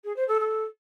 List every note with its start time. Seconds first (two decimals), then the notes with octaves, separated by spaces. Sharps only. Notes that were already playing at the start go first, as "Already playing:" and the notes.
0.04 G#4
0.16 C5
0.28 A4
0.40 A4